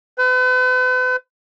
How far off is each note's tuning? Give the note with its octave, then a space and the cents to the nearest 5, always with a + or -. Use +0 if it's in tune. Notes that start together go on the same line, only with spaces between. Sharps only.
B4 +40